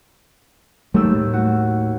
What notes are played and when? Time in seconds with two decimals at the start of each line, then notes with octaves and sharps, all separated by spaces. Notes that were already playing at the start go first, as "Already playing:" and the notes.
0.94 D#2 F#3 G3 A3 E6
1.15 A2
1.33 F#4